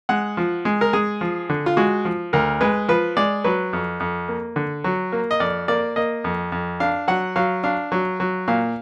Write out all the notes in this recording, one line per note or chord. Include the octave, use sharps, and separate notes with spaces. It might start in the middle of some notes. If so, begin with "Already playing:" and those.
G#3 F#5
F3
G#3
A#4
G#3 G#4
F3
D3
F4
G#3 F#4
F3
D2 A#4
G#3 B4
F3 B4
G#3 D5
F#3 B4
F2
F2
A#3
D3
F#3
A#3
D#5
F2 D5
A#3 D5
A#3 D#5
F2
F2
D4 F5
F#3 F#5
F#3 F5
D4 F5
F#3
F#3
A#2 F5